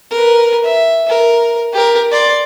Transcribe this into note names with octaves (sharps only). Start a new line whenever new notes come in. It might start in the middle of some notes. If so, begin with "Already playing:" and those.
A#4 B4
E5
A#4
G4 A#4
D5 C6